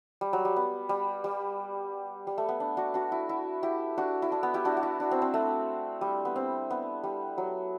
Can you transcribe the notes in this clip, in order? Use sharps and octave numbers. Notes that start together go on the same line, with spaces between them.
G3
F#3
G3
B3
G3
G3
G3
A3
B3
D4
D4 F#4
D4 F#4
E4
E4
E4 G4
D4 F#4
E4
D4
B3
E4 G4
D4 F#4
F#4
E4
D4
C4
C4
A3
G3
B3
C4
B3
G3
F#3